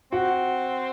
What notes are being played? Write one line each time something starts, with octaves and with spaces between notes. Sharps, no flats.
C4 F#4